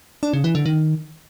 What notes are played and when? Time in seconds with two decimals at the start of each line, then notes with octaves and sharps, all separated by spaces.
0.23 D4
0.33 C#3
0.44 E3
0.55 D3
0.66 D#3